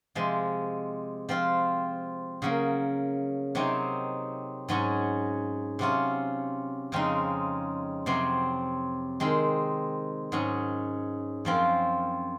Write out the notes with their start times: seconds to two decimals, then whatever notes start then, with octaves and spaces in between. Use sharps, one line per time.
0.15 C3 F3 G#3
1.29 F3 C4 F4
2.42 C#3 F#3 A#3
3.55 C3 F#3 C4 D#4
4.68 G#2 F#3 C#4 F#4
5.79 C3 F#3 C#4 F4
6.92 F2 C#3 G#3 C4 D#4
8.06 F2 C3 F#3 C4
9.20 D#3 G#3 C4
10.32 G#2 F#3 C#4
11.45 F#2 F3 C4 F4